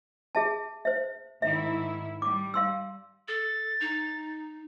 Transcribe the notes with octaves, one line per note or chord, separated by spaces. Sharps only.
G#4 E5 A5
C5 E5
G#2 D#3 E4 E5
G3 D6
F5 C6 E6
A4 A6
D#4